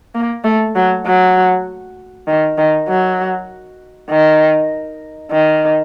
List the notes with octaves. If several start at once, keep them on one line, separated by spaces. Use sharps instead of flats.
A#3
A3
F#3
F#3
D#3
D#3
F#3
D#3
D#3